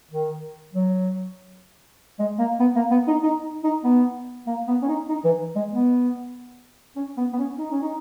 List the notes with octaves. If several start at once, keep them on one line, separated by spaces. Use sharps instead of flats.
D#3
F#3
G#3
A#3
B3
A#3
B3
D#4
D#4
D#4
B3
A#3
B3
C#4
D#4
D#4
E3
G#3
B3
C#4
B3
B3
C#4
D#4
C#4
D#4